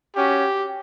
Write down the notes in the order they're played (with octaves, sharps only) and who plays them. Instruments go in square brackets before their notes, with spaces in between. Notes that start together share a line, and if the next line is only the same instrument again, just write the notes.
[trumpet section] C#4 F#4 G4